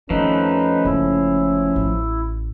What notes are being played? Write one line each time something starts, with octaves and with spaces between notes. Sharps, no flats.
F2 D#3 F3 A3 C#4 D#4 B4
F#1 E4
A1